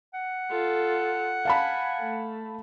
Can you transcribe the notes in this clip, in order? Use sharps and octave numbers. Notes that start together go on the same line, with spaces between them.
F#5
F4 A4
F5 G#5 A5 B5
A3